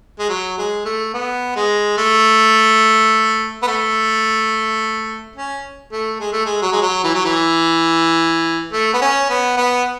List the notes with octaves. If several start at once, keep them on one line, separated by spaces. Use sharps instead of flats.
G#3
F#3
G#3
A3
B3
G#3
A3
B3
A3
C#4
A3
G#3
A3
G#3
F#3
G#3
F#3
E3
F#3
E3
A3
B3
C#4
B3
B3